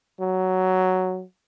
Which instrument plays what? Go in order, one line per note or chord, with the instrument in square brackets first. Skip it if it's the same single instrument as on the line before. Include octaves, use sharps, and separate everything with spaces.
[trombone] F#3